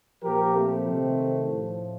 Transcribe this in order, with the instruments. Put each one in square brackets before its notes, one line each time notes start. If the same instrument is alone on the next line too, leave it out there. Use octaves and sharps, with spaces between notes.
[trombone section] A#2 F3 G4 A#4
A3 C4
C3 D#3
A2 F3